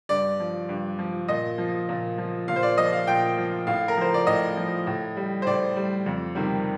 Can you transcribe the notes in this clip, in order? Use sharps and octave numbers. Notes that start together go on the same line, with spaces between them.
G2 D5
F3
G2
F3
A#2 D#5
F3
A#2
F3
A#2 F5
C5
D5
F3 D#5
F5
A#2 G5
F3
A2 F5
A#4
F3 C5
D5
A2 D#5
F3
A2
G3
C5
A2 D5
G3
F2
C3 D#3 G3